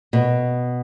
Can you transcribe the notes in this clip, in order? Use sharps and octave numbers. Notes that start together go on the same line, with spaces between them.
B2